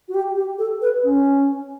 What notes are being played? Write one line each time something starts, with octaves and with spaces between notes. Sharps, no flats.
F#4
G4
G4
A4
B4
C#4